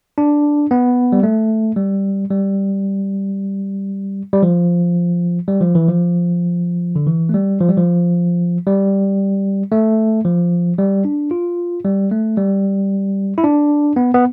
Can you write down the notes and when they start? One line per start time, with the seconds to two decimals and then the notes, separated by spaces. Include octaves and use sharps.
0.18 D4
0.71 B3
1.12 G3
1.23 A3
1.76 G3
2.30 G3
4.33 G3
4.43 F3
5.48 G3
5.61 F3
5.75 E3
5.88 F3
6.96 D3
7.07 E3
7.29 A3
7.34 G3
7.61 F3
7.69 G3
7.77 F3
8.67 G3
9.72 A3
10.25 F3
10.79 G3
11.05 D4
11.31 F4
11.85 G3
12.11 A3
12.37 G3
13.38 E4
13.44 D4
13.96 B3
14.14 B3